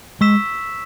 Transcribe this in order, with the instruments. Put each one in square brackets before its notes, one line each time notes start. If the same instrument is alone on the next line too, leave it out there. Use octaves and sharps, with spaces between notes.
[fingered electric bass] G#3 [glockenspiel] C#6 E6 B6 E7